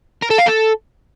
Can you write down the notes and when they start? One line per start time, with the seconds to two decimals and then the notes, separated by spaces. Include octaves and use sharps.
0.22 A#4
0.30 A4
0.38 F5
0.47 A4